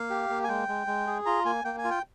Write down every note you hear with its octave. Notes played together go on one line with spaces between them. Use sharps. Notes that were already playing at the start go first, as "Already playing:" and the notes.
Already playing: A#3 F5
G4
A#3
G#5
G#3 G5
G#3
G#3
G#4
F4 A#5
A#3 G#5
A#3 G5
G#5
F4
G5